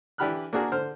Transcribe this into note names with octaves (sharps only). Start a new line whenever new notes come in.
E3 D4 G4 B5 F6 F#6
A#3 D4 F#4 G#4 A#4
D3 C5 F6